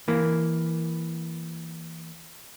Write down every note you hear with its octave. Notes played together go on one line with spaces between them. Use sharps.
E3 A#3